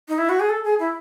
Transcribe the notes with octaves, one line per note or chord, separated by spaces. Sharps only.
D#4
E4
F#4
G#4
A4
G#4
E4